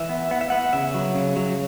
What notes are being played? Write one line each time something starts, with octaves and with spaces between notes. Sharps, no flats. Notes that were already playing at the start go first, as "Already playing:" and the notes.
Already playing: E3 E5
B3
B3 F#5
E5
B3 F#5
C#3 E5
F#3
C#3
F#3